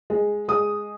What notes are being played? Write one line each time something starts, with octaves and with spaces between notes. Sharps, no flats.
G#3
G#3 D#6